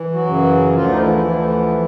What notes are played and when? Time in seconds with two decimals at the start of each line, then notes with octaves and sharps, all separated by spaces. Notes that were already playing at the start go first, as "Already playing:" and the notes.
Already playing: E3
0.13 F#3 F#4
0.25 F#2 C#3 E3
0.75 D2 D3 F3 F4
0.89 D#4
1.00 E3 E4
1.24 D2 D3 F3